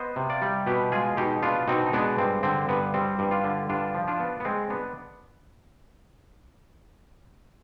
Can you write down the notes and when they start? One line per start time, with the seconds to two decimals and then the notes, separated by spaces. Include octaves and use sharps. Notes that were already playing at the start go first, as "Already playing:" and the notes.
Already playing: B3 C5 D#5
0.16 C3
0.29 D5 F5
0.42 G3
0.67 B2 G4 B4
0.92 G#3 F4 G#4
1.17 B2 D#4 G4
1.43 B3 D4 F4
1.68 B2 C4 D#4
1.86 D#4
1.93 G#3 B3 D4
2.18 G2 C4
2.43 D3 C4
2.69 G2 B3
2.94 G3 C4
3.19 G2
3.31 D4 F4
3.44 D3
3.69 G2 D4 F4
3.94 F3
4.08 D4 F4
4.20 B3
4.40 B3
4.45 G#3 C4
4.70 B3 D4